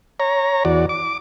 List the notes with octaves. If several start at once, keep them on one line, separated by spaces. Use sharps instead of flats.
C#5 A#5
E2 F#4 D5
D6